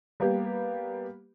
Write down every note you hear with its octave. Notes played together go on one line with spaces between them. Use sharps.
G3 A#3 B3 G4